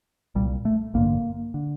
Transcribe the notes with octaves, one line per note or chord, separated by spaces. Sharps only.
C2 A#2 G3
A3
A1 G2 D3 A#3
D3